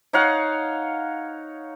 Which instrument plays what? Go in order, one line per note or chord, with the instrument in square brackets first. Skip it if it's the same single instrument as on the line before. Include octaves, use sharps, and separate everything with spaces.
[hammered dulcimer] D#4 C#5 F5 F#5